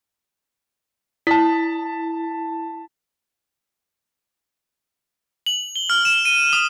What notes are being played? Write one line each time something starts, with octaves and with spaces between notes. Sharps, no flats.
E4 A5 B6
F#7
G7
F6
E7
D#7
D#6